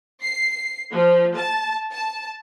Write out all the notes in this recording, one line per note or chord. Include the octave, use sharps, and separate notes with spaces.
C7
F3
A5
A5